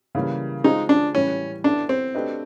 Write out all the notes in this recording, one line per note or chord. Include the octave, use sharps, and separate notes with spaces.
C#3 E3 G3 A#3
G#3 C4 D#4 F4 G#4 C5
D4
A2 E3 G3 C#4
B3 D4 E4 A4
C4
A3 D4 G4 B4 D#5